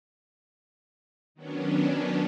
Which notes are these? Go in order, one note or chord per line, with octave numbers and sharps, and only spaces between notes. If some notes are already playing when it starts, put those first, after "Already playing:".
D#3 F#3 B3 C#4 D4